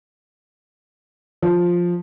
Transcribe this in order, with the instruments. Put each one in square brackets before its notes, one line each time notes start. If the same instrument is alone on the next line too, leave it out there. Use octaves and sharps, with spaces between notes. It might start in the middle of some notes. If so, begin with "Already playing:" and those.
[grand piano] F3